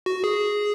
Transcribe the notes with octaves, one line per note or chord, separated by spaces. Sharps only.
F#4
G#4